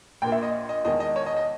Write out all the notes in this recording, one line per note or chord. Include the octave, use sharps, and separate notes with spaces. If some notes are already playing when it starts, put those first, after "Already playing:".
A#1 A#2 A#3 G5
E5
D#5
D#5
E1 E2 D#3 G#3 D#5
D#5
C#5
D#5
D#5